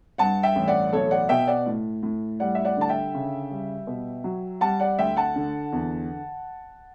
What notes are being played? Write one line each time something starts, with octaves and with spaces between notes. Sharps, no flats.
G2 F#5 A5
E5 G5
A1
D5 F#5
B1 A4 C#5
D5 F#5
B2 E5 G5
D5 F#5
A2
A2
G3 D5 F#5
E5
D5 F#5
D3 A5
E5 G5
C#3
G3
B2
F#3
G3 F#5 A5
D5 F#5
D2 E5 G5
F#5 A5
D3
E2